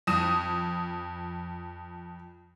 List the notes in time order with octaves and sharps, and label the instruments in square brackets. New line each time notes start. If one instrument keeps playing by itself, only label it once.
[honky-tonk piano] F2 D#6 E7